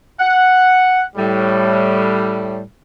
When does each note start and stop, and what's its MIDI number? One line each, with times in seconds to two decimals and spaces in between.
0.19 1.04 78
1.16 2.62 45
1.16 2.62 55